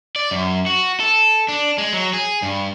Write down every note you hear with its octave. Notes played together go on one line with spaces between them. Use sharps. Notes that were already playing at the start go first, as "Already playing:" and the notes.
D5
F#2
F#4
A4
D4
G#3
F#3
G#4
G2